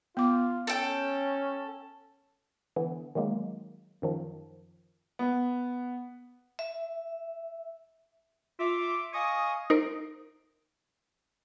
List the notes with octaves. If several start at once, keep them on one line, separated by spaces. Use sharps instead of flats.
B3 F4 D6
C#4 A4 G5
D3 E3 B3
D#3 F#3 G#3 A#3
F#2 D#3 F3
B3
E5
F4 E5 D6
D#5 F5 G#5 C#6 D#6
D#4 A#4 C5 D7